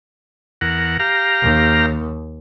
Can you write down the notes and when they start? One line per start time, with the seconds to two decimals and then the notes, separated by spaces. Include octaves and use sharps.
0.61 E2 A#4 F#5
1.00 G4 F5 A#5
1.43 D#2